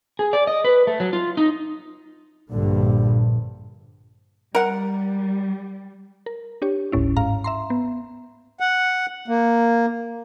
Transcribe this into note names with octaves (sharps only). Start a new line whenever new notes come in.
G#4
D5
D#5
B4
A3
F#3
F4
D#4
A#1 G2 D3
G3 A#4 F#5
A#4
D4 G4 C#5
G1 D2 A2 C#4 E4
G#2 F5 A#5
E5 A#5 C6
B3
F#5
A#3